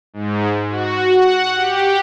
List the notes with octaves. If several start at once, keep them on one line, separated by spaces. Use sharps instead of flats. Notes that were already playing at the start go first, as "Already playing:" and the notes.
G#2
F#4
F#5
G4